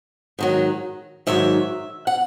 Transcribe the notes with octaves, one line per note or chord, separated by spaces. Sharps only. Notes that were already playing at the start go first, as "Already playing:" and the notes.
G#2 D#3 F#3
G#2 D#3 F#3 E5
F#5